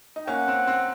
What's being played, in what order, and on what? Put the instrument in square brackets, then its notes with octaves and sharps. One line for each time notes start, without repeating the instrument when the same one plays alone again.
[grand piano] D#4
[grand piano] A#3 C#4 [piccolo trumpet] F#5
[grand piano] C4
C4